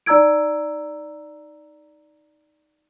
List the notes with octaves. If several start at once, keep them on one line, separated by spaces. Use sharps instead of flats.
D#4 D5 A#5 E6 G#6 D7